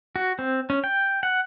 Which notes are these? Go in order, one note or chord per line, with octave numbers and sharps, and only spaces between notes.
F#4
C4
C#4
G5
F#5